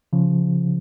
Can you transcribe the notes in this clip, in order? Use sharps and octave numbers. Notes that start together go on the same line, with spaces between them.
C#3 F3